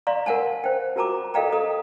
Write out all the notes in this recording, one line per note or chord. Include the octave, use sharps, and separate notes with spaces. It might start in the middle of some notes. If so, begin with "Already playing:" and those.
D5 F5 A#5 C6
A#4 F5 F#5 G#5 A5
C5 G5
F4 F#4 A#4 A5 A#5 D6
A4 D#5 F5 G5 A#5
A4 A#5 D#6